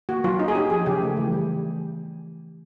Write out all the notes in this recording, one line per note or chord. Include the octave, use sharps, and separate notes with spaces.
A#3 F#4
F#3 F4
C#4 D#4
G#4
C#4 G4
F3 G#4
C#3 G4
A3
E3
G3